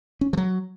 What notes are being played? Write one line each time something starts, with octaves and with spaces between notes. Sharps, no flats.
C#4
F3
F#3